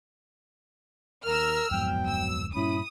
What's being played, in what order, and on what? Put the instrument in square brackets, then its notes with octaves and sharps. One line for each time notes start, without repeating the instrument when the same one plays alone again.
[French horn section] D#2 [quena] A#4 [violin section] E6 F6
[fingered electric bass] D1 F2 G#2 [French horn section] F#3 B3 [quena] G5
[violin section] E6
[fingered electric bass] G2 A#2 G3 [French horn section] C#4 E4 [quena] B5 [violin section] D#6